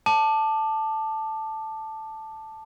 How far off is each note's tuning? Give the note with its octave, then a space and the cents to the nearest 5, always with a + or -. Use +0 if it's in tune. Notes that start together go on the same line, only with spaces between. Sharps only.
A5 +0 D6 +25